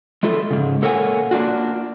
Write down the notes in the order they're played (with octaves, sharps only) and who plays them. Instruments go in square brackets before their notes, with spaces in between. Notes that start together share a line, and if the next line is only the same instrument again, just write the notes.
[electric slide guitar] G#3 A3 F4 A4
G#2 C#3
A#2 A4 A#4 C#5 F#5 G#5
A#3 D4 F4 F#4